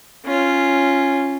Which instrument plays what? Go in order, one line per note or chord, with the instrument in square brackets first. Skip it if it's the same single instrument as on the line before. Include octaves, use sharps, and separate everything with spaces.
[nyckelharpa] C#4 F4